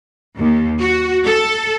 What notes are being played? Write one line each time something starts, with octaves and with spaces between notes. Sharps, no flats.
D#2
F#4
A4